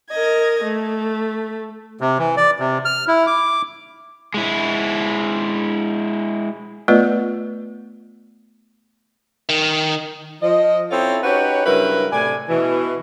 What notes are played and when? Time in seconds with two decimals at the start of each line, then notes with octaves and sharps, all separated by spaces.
0.11 A#4 D#5 G#6
0.64 A3
2.01 C3
2.18 E3
2.37 D5
2.60 C3
2.85 F6
3.08 E4
3.27 D6
4.34 G#3 E4
6.88 A3 B3 F4 B4 D5 D#5
9.49 D#3
10.42 F3 D#5
10.90 C4 C#4 E4 F4 A4 C#5
11.23 C#4 D#4 F#4 G4 B4 C#5
11.66 G2 C#3 F#3 E4 A#4 B4
12.12 A2 C3 D5 G#5
12.49 B2 E3